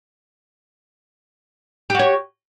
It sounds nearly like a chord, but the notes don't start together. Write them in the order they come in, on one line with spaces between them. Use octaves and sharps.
G4 F#4 C#5